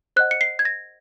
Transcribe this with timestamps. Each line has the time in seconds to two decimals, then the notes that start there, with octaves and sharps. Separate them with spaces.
0.16 C5 D#5 F#5 F#6
0.31 C#7
0.41 C7
0.59 G#6
0.65 A#6